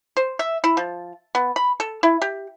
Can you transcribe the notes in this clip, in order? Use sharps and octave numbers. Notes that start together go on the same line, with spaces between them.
C5
E5
E4
F3
B3
B5
A4
E4
G4